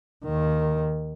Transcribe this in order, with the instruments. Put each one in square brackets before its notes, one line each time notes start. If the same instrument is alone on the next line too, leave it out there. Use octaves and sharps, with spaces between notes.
[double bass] D#2 D#3